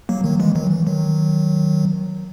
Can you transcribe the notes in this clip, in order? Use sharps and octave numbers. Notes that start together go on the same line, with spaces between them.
F#3 A#3
D#3 F#3
E3 G#3
D#3 F#3
E3
D#3 F#3